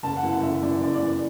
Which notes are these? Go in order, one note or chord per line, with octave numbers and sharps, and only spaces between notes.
F#1 A5
F#5
F#2 E3
F#5
F#1 E5
F#2 E3 D5
F#1 D5
D5
F#2 E3
D5